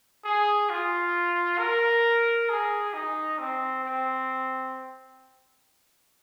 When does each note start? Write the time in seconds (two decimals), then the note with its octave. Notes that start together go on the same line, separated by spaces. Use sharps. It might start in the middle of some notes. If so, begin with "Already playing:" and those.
0.25 G#4
0.69 F4
1.59 A#4
2.49 G#4
2.94 D#4
3.39 C4
3.84 C4